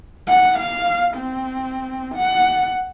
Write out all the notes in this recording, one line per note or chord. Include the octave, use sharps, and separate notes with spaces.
F#5
F5
C4
F#5